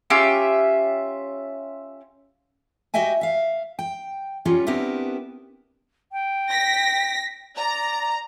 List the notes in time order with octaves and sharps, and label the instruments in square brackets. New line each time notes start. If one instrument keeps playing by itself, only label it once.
[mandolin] C#4 F4 G4 E5
[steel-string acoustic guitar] F#4 G4 D#5 E5 G5 G#5
E5 F5
G5
F#3 G3 C#4 F4 G4 C#5
B3 C4 D4 E4 G4 A#4
[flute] G5
[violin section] A#6 B6
[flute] D5 [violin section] A#5